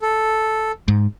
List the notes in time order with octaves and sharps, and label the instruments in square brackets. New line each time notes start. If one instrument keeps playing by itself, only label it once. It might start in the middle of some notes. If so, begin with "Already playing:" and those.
[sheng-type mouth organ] A4
[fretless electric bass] G#2